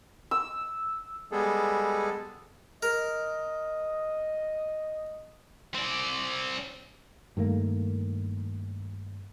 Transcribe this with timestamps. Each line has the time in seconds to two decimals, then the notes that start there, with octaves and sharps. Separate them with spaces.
0.31 E6
1.32 G3 G#3 B3 G#4 A4
2.83 A#4 D#5
5.74 C4 D5
7.37 G2 D#3 A3 A#3